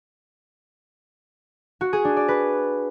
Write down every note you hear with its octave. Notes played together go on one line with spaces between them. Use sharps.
F#4
G#4
D4
D5
B4